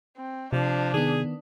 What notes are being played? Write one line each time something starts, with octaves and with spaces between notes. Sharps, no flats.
C4
C3 F3 D4
D#3 B3 G#4